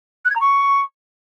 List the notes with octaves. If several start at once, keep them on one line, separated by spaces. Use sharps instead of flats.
F#6
G#6
A#5
C#6